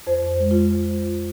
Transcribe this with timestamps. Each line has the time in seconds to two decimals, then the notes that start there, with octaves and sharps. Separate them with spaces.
0.07 F2 C5
0.40 G#3
0.51 F4